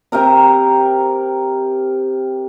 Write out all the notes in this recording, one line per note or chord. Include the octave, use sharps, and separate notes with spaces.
C3 G4 A#4 A#5